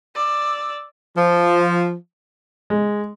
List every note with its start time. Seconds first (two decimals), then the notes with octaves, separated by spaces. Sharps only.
0.15 D5 E6
1.16 F3
2.70 G#3